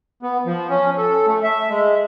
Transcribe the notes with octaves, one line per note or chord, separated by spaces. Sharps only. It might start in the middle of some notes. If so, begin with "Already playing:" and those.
B3
F3
C#4
A4
A3
E5
G#3